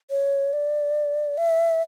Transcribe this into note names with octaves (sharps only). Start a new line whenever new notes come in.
C#5
D5
E5